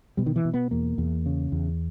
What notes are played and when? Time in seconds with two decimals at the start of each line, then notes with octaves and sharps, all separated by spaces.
0.17 B2 G3
0.26 D#3
0.36 E3
0.45 B2
0.54 B3
0.71 E2 A#3
0.98 E2
1.26 C#3
1.52 E2